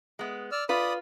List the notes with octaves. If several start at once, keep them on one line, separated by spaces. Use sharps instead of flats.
G#3 B3
D5 E6 F6
F4 B4 D5 B5 D#6